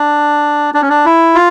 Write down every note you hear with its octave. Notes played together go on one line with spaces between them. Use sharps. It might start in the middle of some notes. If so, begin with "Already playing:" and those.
Already playing: D4
D4
C#4
D4
E4
F4